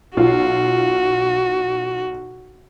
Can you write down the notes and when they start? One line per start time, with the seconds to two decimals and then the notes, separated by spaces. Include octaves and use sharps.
0.17 B1 F4 F#4